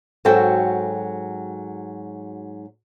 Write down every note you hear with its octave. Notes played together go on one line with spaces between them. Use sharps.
G#2 F#3 C4 F#4 A4 G5